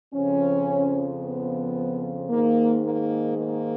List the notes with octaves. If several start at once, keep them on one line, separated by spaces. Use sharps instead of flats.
F2 C#3 F3 C#4
B3
G#2 D#3 G#3 A#3
A#3
A#3